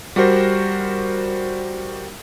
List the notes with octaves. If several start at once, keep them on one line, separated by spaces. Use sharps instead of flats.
G3 F#4 A#4 C5